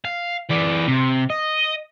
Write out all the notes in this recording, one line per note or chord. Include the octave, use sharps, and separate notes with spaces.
F5
E3 D5
C3
D#5